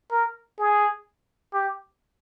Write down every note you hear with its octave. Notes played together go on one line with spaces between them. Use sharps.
A#4
G#4
G4